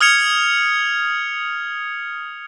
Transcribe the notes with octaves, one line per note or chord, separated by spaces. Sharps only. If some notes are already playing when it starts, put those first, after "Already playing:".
D#6 F6 G#6 C#7 F7